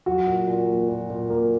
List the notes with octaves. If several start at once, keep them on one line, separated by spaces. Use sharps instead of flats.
F#3 F#4
A#2
A#2
A#3
A#2
A#2
A#3